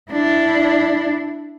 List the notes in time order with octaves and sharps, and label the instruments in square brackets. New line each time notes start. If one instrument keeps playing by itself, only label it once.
[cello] D4 E4